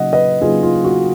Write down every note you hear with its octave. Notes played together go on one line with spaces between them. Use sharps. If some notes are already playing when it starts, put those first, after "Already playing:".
Already playing: C#3 F#3 A#3 D#4 D#5 F#5
B4 D#5
C#3 F#3 A#3 D#4 F4 G#4
F4
F#4